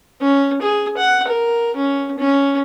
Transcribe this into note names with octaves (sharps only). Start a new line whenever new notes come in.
C#4
G#4
F#5
A#4
C#4
C#4